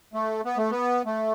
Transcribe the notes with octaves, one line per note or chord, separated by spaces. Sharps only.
A3
B3
A3
B3
A3